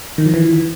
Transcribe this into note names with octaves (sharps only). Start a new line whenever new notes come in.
D#3
F3
E3